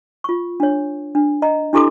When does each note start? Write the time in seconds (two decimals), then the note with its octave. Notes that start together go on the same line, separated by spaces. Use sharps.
0.24 F4 C#6
0.60 D4 C#5
1.15 D4
1.42 D#5 A#5
1.73 D4 E4 G4 A4 C6 D6